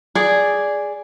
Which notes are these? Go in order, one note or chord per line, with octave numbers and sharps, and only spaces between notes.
G#4 D5